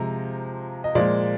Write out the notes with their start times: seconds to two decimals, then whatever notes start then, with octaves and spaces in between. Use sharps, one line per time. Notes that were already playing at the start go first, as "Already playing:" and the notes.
Already playing: C3 F3 G#3 A#5
0.84 D#5
0.95 A#2 F3 G#3 D5